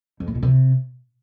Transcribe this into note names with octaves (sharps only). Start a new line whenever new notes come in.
F2
A2
B2
C3